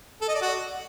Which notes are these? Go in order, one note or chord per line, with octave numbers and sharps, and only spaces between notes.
A4
D#5
D5
F#4